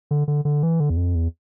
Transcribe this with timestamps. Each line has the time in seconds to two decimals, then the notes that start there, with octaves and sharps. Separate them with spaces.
0.11 D3
0.28 D3
0.45 D3
0.63 E3
0.80 D3
0.90 E2
0.97 F2
1.15 E2